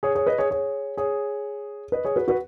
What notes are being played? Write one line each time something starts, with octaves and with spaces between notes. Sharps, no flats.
G#4 C#5
G#4 C#5
B4 D#5
G#4 C#5
G#4 C#5
G#4 C#5
B4 D#5
G#4 C#5
F#4 B4
F#4 B4